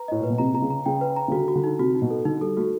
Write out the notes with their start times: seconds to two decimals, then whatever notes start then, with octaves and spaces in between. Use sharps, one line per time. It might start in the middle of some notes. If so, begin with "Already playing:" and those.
Already playing: B4 A#5
0.08 A2 D#5
0.20 A#2 B4
0.30 B2
0.38 C3 A#5
0.54 C3 A#5
0.62 C#3
0.70 A#5
0.86 C#3 G5
1.01 B4
1.16 A#5
1.28 C#3
1.32 D3 F#4
1.48 F#4
1.55 D3
1.64 D#4
1.79 C3 F#4
1.95 D#4
2.02 B2
2.10 A4
2.25 D3 D#4
2.41 G3 A4
2.57 A3 F#4